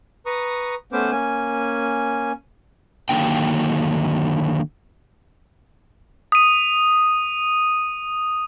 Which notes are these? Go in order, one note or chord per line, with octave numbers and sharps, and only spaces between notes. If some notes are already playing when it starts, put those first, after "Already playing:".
B4 A#5 C#6 D#6
A3 B3 C#4 B4 C5 D6
A#3 C#4 G#5
D3 D#3 F#3 A#3 D4 G5
D#6 D#7